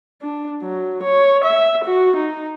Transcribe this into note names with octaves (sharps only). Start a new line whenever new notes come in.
D4
F#3
C#5
E5
F#4
D#4